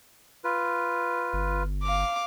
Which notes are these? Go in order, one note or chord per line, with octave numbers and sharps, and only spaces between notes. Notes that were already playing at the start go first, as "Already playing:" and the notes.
F4 B4
G1
F5 D6